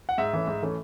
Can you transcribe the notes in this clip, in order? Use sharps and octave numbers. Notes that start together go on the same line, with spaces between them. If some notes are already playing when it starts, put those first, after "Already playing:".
F#5
G#2 E5
E3 A3 C#4
G#2
E3 A3 C#4